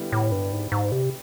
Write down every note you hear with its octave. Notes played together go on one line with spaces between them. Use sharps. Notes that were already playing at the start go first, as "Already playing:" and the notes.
Already playing: D3 G3 B3 E4
A2
G2
G#2
G#2
C3